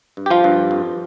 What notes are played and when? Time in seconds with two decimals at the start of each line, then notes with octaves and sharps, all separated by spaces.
0.17 G2
0.26 G4
0.30 F3 F4
0.44 G2
0.71 F2